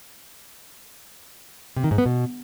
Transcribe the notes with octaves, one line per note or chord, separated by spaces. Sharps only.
C3
D#3
G#2
B3
B2